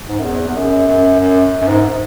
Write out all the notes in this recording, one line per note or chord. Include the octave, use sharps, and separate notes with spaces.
G#2
F#2
E2
E2
F#2
F#2
F#2
F#2
G#2